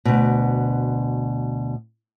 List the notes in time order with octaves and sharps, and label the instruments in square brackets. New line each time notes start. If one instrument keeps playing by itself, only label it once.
[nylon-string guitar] D2 B2